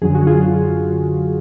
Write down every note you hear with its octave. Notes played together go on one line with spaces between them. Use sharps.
F#2 D3 F#3 G#4
F#4
F4 G#4